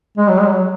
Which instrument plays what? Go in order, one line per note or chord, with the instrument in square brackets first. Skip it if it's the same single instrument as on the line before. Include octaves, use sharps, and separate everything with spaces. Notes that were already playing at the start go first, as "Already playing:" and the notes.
[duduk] G#3
F#3
G#3
F#3